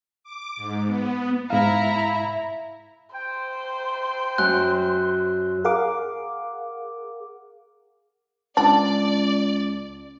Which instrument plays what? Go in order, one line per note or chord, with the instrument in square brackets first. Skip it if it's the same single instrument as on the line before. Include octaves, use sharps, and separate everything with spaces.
[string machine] D6
G#2
B3
[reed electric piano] G#2 F5 [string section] E4 A#5
[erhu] C5 [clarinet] G5
[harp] F#2 [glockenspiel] F#6
[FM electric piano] G#4 A#4 F5 F#5 D6
[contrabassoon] C#2 [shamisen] D4 [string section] D5